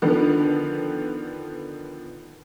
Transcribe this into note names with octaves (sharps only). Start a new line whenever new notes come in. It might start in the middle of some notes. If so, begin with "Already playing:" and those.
D3 D#3 F3 B3